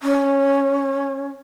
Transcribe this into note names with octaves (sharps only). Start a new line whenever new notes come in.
C#4